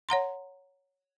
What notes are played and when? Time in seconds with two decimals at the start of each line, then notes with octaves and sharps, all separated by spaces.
0.09 C#5 F#5 A#5 C6